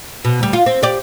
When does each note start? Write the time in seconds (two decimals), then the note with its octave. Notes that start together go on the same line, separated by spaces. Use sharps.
0.25 B2
0.39 D2 G3
0.53 F4
0.66 C4
0.83 G4 D5